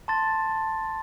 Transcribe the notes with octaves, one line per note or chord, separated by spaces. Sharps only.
A5 C6 A6